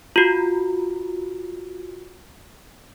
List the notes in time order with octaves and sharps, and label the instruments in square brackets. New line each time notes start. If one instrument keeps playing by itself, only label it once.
[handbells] F4 F#4